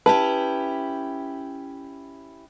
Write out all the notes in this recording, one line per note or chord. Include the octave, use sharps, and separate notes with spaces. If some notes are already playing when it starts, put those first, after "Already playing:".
C#4 E4 G4 B4 A5